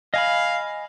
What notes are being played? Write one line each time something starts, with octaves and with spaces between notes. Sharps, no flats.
D#5 F5 G#5 B5